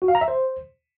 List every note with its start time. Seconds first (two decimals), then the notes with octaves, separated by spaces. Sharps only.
0.02 F#4
0.08 F5
0.15 A#5
0.21 E5
0.28 C5